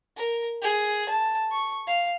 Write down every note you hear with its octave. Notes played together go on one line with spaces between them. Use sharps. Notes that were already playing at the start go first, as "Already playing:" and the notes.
A#4
G#4
A5
C#6
F5